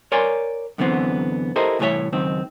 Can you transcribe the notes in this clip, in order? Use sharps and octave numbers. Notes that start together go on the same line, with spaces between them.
A#4 C#5 D5 G#5 C6
F#2 D3 E3 B3 C4
E4 G4 A4 A#4 C5 D#5
C2 A2 E3 G#4 C#5 E5
C#2 F#2 D#3 C4